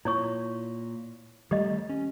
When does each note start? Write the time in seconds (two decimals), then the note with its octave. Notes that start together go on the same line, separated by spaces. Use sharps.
0.05 A#2 E4 C#5 C#6
1.51 D#3 G3 A3 G4 D#5
1.89 C#4